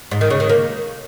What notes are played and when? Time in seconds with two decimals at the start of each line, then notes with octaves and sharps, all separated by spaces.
0.11 G#2
0.21 D#3
0.30 C#3
0.40 D#3
0.49 A#3